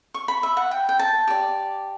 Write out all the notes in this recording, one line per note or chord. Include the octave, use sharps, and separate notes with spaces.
C#6
B5
E5
F#5
G5
G5
A5
G4 D5